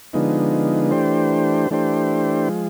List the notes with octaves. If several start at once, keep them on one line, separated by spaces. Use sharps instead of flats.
D3 F3 G#3 B3 D#4
E3 A3 D4 G4 C5
E3 A3 D4 G4 C5
F3 G#3